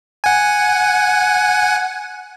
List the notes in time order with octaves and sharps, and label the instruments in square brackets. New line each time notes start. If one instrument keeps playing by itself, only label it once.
[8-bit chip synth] F#5 G#5